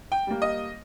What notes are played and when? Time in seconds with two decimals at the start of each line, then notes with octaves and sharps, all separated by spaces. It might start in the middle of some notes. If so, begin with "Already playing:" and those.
0.12 G5
0.27 G3 A#3
0.42 D#5